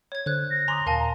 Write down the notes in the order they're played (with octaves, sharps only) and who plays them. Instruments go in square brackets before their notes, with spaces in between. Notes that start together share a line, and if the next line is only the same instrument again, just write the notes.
[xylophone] C#5 G#6
[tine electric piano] D3 [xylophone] C5 F#6
[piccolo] A#6
[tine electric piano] G#5 D6 D#6 [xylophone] A#5 C6
[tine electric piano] D#2 A#2 [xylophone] A#4 F5 G#5 [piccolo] A5
[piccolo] A#5